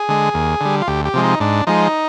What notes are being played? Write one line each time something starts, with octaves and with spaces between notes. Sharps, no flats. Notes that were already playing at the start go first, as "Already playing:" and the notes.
Already playing: G#4
D3 G#3
D#2
D3 G3
F4
D2 G4
G4
C3 F3 G#3
D#4
G#2 D4
F3 G#3 D#4